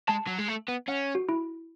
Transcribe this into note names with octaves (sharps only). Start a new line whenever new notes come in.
G#3 A5
F#3
G#3
A3
B3
C#4 F#5
F#4
E4